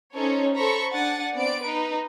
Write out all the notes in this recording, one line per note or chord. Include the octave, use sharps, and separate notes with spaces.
C#4 D#4 A4 C5 C#5
A4 C5 A#5 B5 C#6
D4 F#5 G#5 A6
B3 C4 D5 D7
D#4 B4